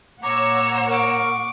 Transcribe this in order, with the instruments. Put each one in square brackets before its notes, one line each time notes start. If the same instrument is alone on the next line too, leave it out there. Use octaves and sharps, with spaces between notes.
[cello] A#2 F#5 [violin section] C#5 A#5 E6 [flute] D6
[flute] A#4 [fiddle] C#6 D6